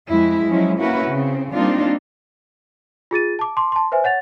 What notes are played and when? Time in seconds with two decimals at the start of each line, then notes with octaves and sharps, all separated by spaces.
0.10 F2 G#3 E4
0.47 F3 F#3 G#3 C#4 E4
0.79 A#3 C#4 E4 F#4 B4
1.09 C#3 C4
1.53 G3 A#3 C4 D4 D#4 F4
3.11 F4 G#4 A6 D#7
3.39 A5 D6
3.57 A5 C6 D6
3.72 A5 C6
3.92 B4 C5 E5 G#5
4.04 C#5 F#5 A6 F7